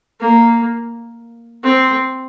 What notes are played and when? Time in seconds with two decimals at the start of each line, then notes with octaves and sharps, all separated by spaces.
0.20 A#3
1.64 C4